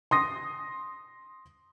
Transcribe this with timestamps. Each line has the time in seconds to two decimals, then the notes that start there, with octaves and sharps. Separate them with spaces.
0.11 C6 D#6 A#6